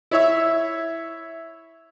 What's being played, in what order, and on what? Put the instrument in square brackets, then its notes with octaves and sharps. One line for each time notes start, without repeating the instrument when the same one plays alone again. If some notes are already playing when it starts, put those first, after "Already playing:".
[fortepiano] E4 C#5 E5